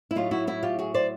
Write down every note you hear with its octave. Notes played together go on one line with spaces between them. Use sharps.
E4
A2 F#3 D#4 F4
E4 F#4
E4 F#4
F4 G4
F#4 G#4
C5 D5